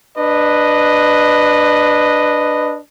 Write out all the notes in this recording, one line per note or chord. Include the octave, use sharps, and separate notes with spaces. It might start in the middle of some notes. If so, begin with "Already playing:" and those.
D4 B4 D#5